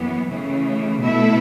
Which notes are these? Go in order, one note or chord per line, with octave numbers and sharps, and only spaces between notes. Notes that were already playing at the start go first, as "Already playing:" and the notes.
Already playing: F#2 E3 B3
C#3 E3 A3
B2 A3 E4 A4 E5